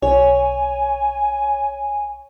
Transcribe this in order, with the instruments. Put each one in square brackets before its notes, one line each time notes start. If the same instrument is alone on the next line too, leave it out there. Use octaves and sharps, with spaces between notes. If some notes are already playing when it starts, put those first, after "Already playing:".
[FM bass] B1 [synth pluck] C#5 [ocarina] G#5